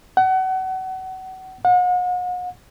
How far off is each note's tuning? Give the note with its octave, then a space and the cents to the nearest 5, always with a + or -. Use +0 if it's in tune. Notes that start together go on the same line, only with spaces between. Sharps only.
F#5 +30
F#5 -40